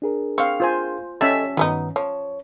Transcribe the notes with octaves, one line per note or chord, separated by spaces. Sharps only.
D4 G#4 A#4
C4 F5 C#6
F4 C5 G#5
G3 C#4 A4 D#5 E5 A5
G2 D#3 F#3 B3 D#4
F3 C#5